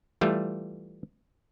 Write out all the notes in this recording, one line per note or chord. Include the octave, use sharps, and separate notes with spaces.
E3 G3 A3 F4